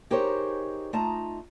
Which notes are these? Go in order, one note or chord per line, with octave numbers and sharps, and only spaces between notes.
D#4 G4 G#4 A#4 C5 C#5
A3 D#4 F4 D#5 A5 A#5